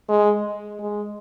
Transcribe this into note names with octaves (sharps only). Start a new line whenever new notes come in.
G#3
G#3